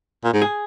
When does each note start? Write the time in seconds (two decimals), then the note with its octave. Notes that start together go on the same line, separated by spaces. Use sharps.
0.24 A#2
0.33 G#2
0.42 G#4